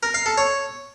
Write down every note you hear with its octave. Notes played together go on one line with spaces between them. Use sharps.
A#4
F5
A4
C#5